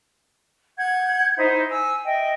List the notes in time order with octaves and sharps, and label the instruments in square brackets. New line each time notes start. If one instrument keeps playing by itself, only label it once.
[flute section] F#5 G6 G#6
D#4 E4 C5
G#5 E6
D#5 E5 G5